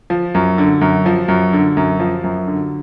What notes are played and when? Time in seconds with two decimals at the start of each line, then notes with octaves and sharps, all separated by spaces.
0.10 F3
0.35 F#2
0.58 D3
0.81 F#2
1.06 F3
1.28 F#2
1.53 D3
1.77 F#2
2.00 F3
2.24 F#2
2.47 D3